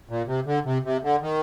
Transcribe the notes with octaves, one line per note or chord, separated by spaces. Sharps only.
A#2
C3
D3
C3
C3
D3
D#3